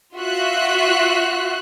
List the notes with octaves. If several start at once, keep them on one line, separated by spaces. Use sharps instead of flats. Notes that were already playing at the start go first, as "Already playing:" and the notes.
F4 F#4 E5 F#6